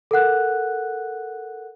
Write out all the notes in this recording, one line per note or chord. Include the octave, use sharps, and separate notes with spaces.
A4 A#4 F#5 F#6